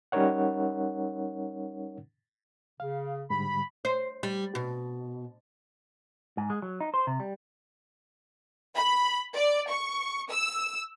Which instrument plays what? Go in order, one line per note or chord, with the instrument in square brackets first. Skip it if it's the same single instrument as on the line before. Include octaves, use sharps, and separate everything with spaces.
[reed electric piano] G3 C#4 D#4 A#4 C#5 F#5
[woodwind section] C#3 [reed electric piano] F5
[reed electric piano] G#2 D3 G3 [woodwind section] B5
[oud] C5
G3
B2
[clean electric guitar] G#2
G#3
F#3
D#4
C5
C3
G3
[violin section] B5
D5
C#6
E6